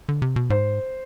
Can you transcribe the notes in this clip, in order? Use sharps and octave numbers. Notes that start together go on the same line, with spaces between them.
D3
C3
B2
G#2 C5